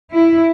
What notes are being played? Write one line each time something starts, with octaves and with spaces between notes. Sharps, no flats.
E4